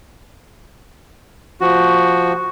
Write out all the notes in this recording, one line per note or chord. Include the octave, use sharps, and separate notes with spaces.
F3 F#4